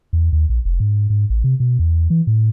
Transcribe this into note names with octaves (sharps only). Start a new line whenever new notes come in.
E2
D#2
A#1
F1
G#2
G#2
A1
C3
B2
E2
E3
A2